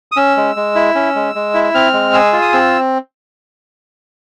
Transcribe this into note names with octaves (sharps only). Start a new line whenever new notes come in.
D#6
C#4 E6
G#3
G#3
E4
C#4
G#3
G#3
E4
E6
C4 F6
G#3
G#4 E6
F4
D#6
C4 E6